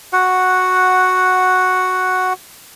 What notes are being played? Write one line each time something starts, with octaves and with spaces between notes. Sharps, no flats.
F#4 F#5